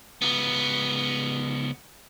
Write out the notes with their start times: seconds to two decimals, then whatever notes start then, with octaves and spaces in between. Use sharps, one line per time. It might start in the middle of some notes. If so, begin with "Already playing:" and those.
0.22 C#2 B3